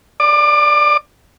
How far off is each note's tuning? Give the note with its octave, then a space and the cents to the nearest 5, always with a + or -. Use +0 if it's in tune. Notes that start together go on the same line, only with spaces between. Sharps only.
D5 +0 D6 +30